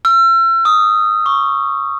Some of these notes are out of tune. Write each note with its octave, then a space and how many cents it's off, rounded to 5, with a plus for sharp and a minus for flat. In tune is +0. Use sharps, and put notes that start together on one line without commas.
E6 +40
D#6 +0
C#6 -5